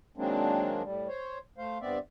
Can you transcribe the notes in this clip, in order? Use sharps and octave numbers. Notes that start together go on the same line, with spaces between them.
D#3 F#3 G#3 A#3 C4 D4
A2 G3
C5 C#5
A3 C5 F5
G2 B3 C4 D5 E5